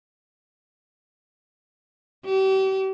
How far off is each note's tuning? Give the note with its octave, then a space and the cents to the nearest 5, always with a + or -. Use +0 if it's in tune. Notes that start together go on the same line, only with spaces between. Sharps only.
G4 -35